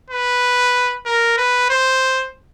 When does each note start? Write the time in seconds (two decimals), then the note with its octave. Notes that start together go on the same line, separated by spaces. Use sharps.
0.10 B4
1.06 A#4
1.38 B4
1.70 C5